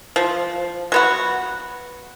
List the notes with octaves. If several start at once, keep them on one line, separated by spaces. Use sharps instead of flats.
F3
F#3 B3 F#4